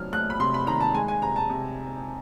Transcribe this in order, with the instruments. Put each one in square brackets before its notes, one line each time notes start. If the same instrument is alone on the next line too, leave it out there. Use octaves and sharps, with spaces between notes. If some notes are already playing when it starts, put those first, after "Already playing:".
Already playing: [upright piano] C3 D#3 F#3 A3 F6
A3 F#6
B5
C3 C6
B5
D#3 A#5
A5
G#3 G#5
G#5
C3 A#5
A5
C3